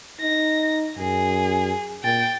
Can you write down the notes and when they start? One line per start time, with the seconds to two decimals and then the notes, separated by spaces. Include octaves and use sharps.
0.21 D#4 A#6
0.98 F#2 G#4
2.04 A#2 G5 A6